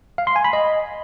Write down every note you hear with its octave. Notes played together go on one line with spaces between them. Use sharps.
F5
C6
G#5
B5
D#5